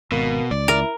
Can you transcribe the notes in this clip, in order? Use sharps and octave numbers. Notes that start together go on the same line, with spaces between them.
G#1 B2 A#3
C#2 D5
E4 A#4